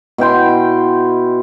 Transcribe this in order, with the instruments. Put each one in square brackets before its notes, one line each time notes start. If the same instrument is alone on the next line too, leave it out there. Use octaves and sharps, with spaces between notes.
[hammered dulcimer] B2 E4 G5 C6